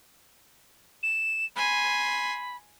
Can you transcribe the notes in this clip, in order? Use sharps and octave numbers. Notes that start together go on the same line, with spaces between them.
E7
G#5 B5 C6